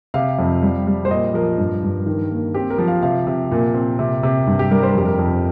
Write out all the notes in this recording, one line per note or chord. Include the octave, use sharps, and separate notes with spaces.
C3 F5
F2
G3
G3
C5
A#2 D#5
F3 A#4
G2
G2
D#3
A#3
C4 G4
A#4
F3
F5
C3 F5
C3
A#2
C4
C3
C3
G2
G4
G3 A#4
C5
A#4
F2 G4
A#4
F2